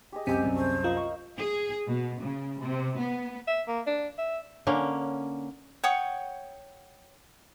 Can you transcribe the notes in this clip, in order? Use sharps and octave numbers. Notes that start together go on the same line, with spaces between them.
G4 G#4 D#5
C#2 F#2 C4 G4 G#5 E6
C2 F#2
A3 C5
F4 A#4 D#5 F5
C#6
G#4
B2
C#3
C3
B3
E5
A#3
D4
E5
D3 A#3 C#4
C#5 F#5 G5 D#6